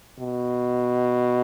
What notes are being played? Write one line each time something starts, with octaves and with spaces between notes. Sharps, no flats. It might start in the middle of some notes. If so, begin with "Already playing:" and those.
B2